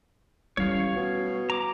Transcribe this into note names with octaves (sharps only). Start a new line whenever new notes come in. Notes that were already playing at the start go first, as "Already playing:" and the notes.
A1 G3 C#4 C#5 F5
B2
A#5 D6